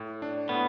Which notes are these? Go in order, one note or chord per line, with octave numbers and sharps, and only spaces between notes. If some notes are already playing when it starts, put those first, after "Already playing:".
Already playing: A2
D4
A2 B3